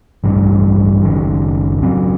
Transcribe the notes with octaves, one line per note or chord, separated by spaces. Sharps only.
A1 G2 E3
F#1 F#2 D#3
F#1 F#2 F#3 C4